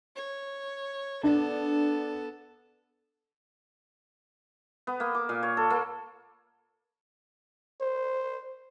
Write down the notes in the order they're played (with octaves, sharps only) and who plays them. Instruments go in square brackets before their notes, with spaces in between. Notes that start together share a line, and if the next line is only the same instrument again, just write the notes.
[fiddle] C#5
[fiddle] B3 A4 [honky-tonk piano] D4
[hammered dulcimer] B3
A#3
D6
A#2
C#5
A4
A#3
[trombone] C5